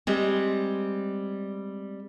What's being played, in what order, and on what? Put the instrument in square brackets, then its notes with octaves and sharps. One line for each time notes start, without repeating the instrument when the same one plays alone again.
[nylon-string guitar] G3 G#3 C4